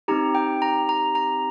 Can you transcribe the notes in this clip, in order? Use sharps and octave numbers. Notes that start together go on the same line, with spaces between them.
C4 D#4 G4 A#5
G5
A#5
A#5
A#5